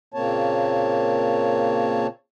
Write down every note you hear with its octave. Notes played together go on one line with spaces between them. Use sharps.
A#2 C#3 A#3 C4 C#5 A5